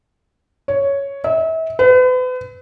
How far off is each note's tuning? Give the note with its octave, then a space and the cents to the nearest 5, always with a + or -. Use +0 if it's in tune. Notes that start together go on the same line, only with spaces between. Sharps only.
C#5 +5
E5 -35
B4 +40